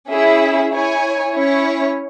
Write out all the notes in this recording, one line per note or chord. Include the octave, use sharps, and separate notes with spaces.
C#4 E4 G#4 E5
E4 C#5 G#5
C#4 E4 C#5